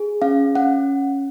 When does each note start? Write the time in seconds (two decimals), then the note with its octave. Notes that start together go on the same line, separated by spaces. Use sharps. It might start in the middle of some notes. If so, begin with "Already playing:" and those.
Already playing: G#4
0.22 C#4 F5
0.55 C#4 F#5